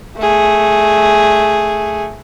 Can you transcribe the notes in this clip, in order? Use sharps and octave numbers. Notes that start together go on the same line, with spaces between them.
A3 G#4